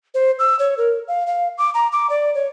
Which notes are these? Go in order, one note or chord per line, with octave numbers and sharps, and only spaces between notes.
C5
E6
C#5
A#4
F5
F5
D6
A#5
D6
D5
C#5